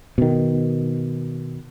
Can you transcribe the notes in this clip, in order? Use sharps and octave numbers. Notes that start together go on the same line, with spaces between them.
B2 D#3